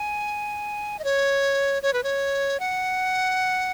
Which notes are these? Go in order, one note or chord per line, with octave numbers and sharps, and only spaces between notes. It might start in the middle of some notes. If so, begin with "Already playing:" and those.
Already playing: G#5
D#5
C#5
C#5
B4
C#5
F#5